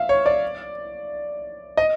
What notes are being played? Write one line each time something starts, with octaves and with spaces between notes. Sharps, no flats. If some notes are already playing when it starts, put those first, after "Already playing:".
Already playing: E5 F5
C#5
D5
D#5